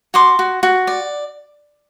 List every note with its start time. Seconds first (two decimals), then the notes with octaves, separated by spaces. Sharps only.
0.14 F#4 C6 D6
0.39 F#4
0.63 F#4
0.87 D5